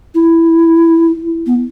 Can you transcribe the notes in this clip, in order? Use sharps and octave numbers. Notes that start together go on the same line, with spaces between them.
E4
B3